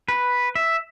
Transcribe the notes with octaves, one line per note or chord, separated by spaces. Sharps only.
B4
E5